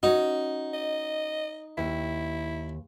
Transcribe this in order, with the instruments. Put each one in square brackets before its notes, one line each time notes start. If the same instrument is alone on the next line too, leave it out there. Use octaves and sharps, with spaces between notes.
[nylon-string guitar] C#4 F#4 [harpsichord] D#4
[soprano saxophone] D#5
[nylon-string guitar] D#2 [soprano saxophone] E4